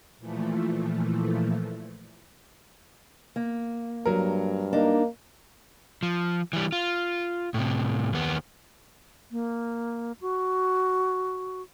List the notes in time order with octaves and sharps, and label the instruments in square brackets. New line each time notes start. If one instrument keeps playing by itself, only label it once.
[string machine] A#2 E3 F3 A3
[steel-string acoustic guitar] A#3
[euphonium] G2 [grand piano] F#3 A#4
[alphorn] A#3 [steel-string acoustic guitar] D4 D#4
[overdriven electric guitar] F3
E3 G3
F4
A2 C3
D#2 B3
[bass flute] A#3
F#4